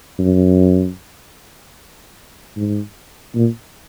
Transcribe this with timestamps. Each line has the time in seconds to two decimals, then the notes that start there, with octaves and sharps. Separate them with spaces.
0.19 F#2
2.56 G#2
3.35 A#2